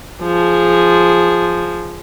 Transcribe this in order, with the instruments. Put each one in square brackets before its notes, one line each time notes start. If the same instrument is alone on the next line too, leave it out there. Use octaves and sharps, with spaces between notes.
[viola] F3 G#4